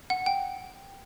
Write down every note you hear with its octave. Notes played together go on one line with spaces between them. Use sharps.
F#5
G5